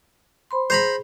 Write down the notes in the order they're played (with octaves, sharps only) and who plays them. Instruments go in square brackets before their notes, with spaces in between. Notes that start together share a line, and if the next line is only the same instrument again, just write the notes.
[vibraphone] C5 B5 C6
[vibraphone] G#4 [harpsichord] C5 A#5 B5